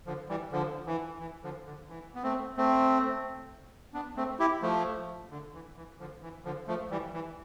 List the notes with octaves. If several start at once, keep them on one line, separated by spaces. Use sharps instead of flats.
D3 F3
E3 G3
D3 F3
E3
E3
D3 F3
D3
E3
B3
A3 C4
A3 C4
B3 D4
A3 C4
E4 G4
F3 A3
D3
E3
E3
D3 F3
E3
D3 F3
F3 A3
E3 G3
E3